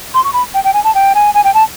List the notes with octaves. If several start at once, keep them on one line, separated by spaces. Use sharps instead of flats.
C6
C#6
B5
G5
G5
G#5
A5
G5
G#5
G#5
G5
A5